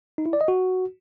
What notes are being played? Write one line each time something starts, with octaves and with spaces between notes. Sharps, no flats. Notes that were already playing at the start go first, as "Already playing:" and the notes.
D#4
E4
D5
D#5
F#4